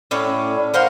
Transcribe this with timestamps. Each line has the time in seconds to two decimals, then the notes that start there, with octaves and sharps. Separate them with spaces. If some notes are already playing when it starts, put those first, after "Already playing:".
0.11 A2 C#4 D5
0.74 A#4 C5 F5 F#5